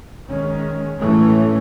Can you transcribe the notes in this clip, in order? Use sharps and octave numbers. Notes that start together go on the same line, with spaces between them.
D#3 G#3 C#4
A2 E3 A3 C#4